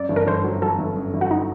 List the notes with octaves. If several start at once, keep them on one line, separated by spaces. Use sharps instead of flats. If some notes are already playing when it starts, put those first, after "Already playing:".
Already playing: F#2 D5
G1
A#4
G1 C5
F#3
F#3 A4
G1
F#2
G1
F#4
D#4